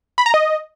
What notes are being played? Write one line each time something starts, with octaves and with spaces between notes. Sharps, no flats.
B5
A#5
D#5